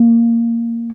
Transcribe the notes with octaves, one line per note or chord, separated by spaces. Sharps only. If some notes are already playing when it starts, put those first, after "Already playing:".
Already playing: A#3